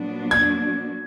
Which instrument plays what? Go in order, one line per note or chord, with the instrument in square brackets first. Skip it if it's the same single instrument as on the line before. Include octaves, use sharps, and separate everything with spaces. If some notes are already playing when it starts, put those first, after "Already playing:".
Already playing: [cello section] A#2 F#3 B3 D4 F#4
[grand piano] G#6